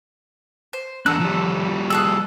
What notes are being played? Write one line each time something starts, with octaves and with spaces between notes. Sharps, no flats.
C5
E2 D4 A4 F#5 A#5 E6 F#6
F3 G3
G#4 A4 E6 F#6